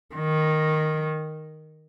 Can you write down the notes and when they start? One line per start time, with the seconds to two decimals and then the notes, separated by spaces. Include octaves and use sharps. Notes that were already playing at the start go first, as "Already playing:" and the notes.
0.15 D#3